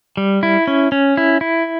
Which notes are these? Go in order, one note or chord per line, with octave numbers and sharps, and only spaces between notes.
G3
E4
C#4
C#4
E4
E4